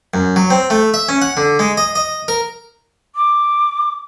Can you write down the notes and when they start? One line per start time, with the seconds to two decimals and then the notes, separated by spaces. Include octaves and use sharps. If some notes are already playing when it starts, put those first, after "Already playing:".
0.14 F#2
0.36 F#3
0.50 C4
0.70 A3
0.94 E5
1.09 C#4
1.22 F#5
1.37 D3
1.59 G#3
1.77 D#5
1.95 D#5
2.28 A#4
3.15 D6